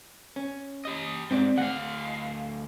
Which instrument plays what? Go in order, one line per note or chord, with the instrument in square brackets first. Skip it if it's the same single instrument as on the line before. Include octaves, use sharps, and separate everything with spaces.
[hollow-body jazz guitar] C#4
[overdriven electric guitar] G4 D#5
[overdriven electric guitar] G#2 [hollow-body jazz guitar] C4 D5
[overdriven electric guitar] D2 F5 [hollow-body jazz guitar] F#5